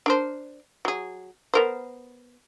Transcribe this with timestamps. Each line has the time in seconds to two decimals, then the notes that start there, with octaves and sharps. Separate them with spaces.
0.06 D4 A#4 C5
0.85 F#3 G#4
1.54 B3 A#4 C5